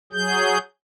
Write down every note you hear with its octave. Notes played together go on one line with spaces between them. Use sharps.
F#3 G#4 G6